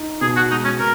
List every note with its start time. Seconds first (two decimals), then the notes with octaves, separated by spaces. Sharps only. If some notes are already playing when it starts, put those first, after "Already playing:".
Already playing: D#4
0.21 B2 G#4
0.36 F#4
0.51 G#3 D#4
0.64 C#4
0.79 B2 A#4